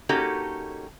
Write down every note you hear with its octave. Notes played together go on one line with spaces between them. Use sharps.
A#3 C#4 D#4 F#4 G4 A4